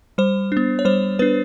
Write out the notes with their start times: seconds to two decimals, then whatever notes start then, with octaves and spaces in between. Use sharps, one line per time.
0.18 G3 C5
0.52 B3 D4
0.79 C#5
0.85 G3 C5
1.19 B3 D4 B4